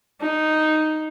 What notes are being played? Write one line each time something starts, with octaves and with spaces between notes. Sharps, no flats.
D#4